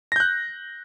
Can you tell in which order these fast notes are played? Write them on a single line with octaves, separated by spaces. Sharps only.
A#6 G6 F#6